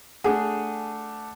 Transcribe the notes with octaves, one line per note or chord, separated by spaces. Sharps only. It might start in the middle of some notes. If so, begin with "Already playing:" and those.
A3 D4 G#4 F#5